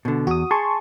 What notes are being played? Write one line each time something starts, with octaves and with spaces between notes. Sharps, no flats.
B2 D3
E2 F#4 D#6
G#4 A5 C6 C#6